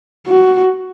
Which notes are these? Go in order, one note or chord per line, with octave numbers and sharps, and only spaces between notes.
F#4